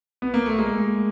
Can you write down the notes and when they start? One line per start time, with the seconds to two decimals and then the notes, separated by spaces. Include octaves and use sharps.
0.22 B3
0.34 A#3
0.46 A3
0.59 G#3 A#3